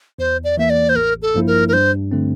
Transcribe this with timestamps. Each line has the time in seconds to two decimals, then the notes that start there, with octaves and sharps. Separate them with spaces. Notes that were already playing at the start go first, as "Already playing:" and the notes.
0.18 E2 C5
0.44 D5
0.57 E3 A#3 E5
0.70 D5
0.89 C5
0.95 A1 A#4
1.22 A4
1.34 G2 F3 A#3 E4
1.47 A#4
1.68 A#4
1.73 G2 C5
2.11 D3 A3 C4